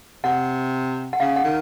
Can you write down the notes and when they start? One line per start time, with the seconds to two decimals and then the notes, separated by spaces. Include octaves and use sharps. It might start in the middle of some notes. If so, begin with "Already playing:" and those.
0.24 C3 F#5
1.13 F#5
1.20 C#3 F5
1.36 F#5
1.44 D#3